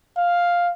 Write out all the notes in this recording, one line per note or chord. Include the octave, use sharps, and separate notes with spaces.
F5